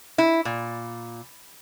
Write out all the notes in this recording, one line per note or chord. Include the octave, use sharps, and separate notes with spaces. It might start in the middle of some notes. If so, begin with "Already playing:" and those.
E4
A#2